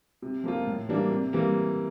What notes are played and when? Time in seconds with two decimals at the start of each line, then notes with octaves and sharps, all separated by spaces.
0.22 C3
0.44 F3 A#3 F4
0.66 A2
0.89 E3 G3 A#3 D4
1.11 C3
1.33 E3 G3 A#3